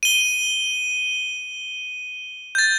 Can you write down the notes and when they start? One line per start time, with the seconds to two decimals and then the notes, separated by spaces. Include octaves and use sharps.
0.03 D#7 G7
2.55 G6 A6